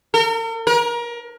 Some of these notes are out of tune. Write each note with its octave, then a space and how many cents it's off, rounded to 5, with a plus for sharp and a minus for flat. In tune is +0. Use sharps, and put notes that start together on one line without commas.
A#4 -45
A#4 +30